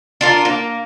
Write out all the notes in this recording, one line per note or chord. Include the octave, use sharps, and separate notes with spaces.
D4 F4 A#4
A#3